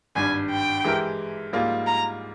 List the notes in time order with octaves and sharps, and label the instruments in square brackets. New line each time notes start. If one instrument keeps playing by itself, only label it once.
[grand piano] G#1 G2 G3 [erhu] G#5
[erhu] G5
[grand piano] E3 G#3 E4 G4 A#4
G#2 G3 A#3 F4 G#4
[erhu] A#5